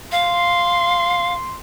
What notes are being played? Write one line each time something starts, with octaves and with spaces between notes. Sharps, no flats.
F5 C6